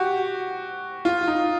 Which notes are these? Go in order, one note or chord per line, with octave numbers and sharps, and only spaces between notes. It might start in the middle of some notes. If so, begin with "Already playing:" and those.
Already playing: F#4 G4
F4
D#4